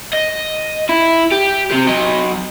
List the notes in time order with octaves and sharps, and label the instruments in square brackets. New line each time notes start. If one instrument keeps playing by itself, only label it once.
[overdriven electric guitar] D#5
E4
G4
C4 G4
F#3 D#5